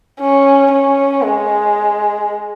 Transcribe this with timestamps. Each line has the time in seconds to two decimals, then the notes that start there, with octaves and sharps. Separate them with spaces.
0.21 C#4
0.72 C#4
1.24 G#3